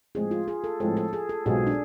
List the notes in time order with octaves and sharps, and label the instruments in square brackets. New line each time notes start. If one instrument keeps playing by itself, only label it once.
[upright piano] A2 F3 G#3 C4 [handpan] G#4
[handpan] F4
G#4
A4
[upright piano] A2 F3 G#3 C4 [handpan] A4
[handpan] A4
G#4
A4
[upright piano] B1 B2 G#3 C4 F4 [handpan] G#4
[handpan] D4